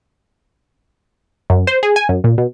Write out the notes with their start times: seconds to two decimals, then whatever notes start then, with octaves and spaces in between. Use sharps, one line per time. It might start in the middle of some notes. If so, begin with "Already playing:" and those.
1.50 F#2
1.67 C5
1.83 G#4
1.96 G#5
2.09 F#2
2.24 A#2
2.38 B2